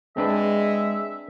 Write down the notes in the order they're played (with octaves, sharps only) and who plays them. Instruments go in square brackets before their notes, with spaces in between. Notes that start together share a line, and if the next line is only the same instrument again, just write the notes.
[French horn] G#3 [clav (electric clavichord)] C4 D4 B4 [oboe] E5